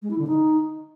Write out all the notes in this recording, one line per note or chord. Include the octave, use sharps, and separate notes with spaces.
G#3
E4
D3
D#4